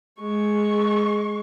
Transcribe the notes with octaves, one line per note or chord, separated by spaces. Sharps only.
G#3 C#6